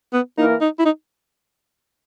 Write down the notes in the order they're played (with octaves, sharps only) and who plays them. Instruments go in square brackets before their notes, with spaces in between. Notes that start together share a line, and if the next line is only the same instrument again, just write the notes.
[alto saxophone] B3
[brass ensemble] E3 A#3 E4 A#4 [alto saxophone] D#4
[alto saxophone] D#4
E4
D#4